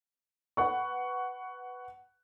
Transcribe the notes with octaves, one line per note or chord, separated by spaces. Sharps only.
B4 F#5 C#6